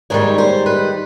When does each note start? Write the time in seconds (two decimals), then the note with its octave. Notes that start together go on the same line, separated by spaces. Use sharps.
0.10 G#2 D#3 G3 C#5
0.38 C5
0.66 B4